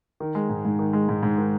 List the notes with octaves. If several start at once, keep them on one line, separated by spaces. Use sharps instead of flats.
D#3
G#3
G#2
G#2
D#3
G#3
G#2
G#2
D#3